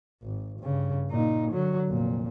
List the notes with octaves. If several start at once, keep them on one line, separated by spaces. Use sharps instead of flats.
G#1
G2 C#3
A#2 D#4
D3 F#3
F1 A#2